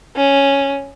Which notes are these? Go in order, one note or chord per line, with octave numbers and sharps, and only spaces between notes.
C#4